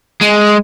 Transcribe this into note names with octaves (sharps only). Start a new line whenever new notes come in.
G#3